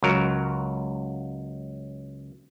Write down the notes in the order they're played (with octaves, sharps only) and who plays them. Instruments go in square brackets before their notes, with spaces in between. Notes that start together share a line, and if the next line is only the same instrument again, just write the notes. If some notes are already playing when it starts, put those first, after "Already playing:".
[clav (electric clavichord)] C#2 F#3 A#4